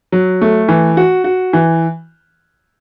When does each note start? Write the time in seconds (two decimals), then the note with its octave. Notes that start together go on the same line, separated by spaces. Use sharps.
0.12 F#3
0.42 A3
0.68 E3
0.97 F#4
1.24 F#4
1.53 E3